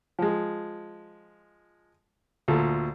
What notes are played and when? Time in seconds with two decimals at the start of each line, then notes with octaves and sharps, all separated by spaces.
0.19 F3 G#3
2.48 D2 A#2 A4